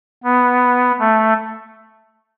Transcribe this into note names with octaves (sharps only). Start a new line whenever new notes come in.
B3
A3